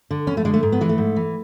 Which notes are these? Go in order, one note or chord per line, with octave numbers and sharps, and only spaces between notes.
D3
E2 C#4
A3
D3 G#3
A3
G#2
B3
E3 G#3
A3
G#2
E3